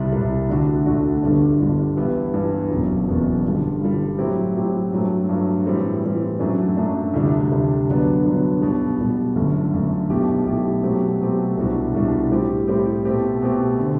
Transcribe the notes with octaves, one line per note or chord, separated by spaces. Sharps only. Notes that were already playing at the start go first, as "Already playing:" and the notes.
Already playing: C2 C3 G3
C2 C3 G3
D2 D3 A3 D4 F#4
D2 D3 A3 D4 F#4
G1 G2 D3 G3 D4
G1 G2 D3 G3 D4
G2 E3 B3 E4 G4
G2 E3 B3 E4 G4
F#1 E2 B2 F#3
F#1 E2 B2 F#3
G2 D3 G3
G2 D3 G3
A2 F#3 C4 E4 G4
A2 F#3 C4 E4 G4
G2 F#3 A3
G2 F#3 A3
A2 E3 G3 C4
A2 E3 G3 C4
F#2 F#3 A3 D4
F#2 F#3 A3 D4
D2 C3 G3 D4
D2 C3 G3 D4
G2 D3 F#3 B3 D4
G2 D3 F#3 B3 D4
B1 B2 G3
B1 B2 G3
G1 F#2 D3 A3
G1 F#2 D3 A3
B1 B2 A3 E4 G4
B1 B2 A3 E4 G4
B2 F#3 A3 C4 G4
B2 F#3 A3 C4 G4
C2 B2 G3 D4 F#4
C2 B2 G3 D4 F#4
A2 G3 C4 G4
A2 G3 C4 G4
B2 A3 C4 G4
B2 A3 C4 G4
D3